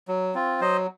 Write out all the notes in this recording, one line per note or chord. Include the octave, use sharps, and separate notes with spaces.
F#3
C4 F4
F#3 C5 D#5